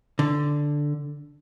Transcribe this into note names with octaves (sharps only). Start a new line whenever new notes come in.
D3